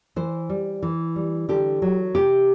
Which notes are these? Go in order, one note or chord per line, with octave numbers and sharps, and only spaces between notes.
E3 C5
G3
E3
G3
D3 G4
F#3
C3 G4